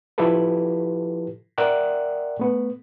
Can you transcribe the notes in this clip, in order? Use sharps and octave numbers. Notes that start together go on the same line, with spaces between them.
F3 E4 F4 G4 A4 B4
A#4 D5 E5 F#5 G5 F#6
A3 B3